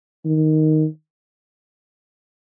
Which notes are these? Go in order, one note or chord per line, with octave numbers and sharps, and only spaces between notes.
D#3